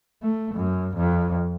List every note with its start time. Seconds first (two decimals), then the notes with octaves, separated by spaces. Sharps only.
0.23 A3
0.55 F#2
0.97 F2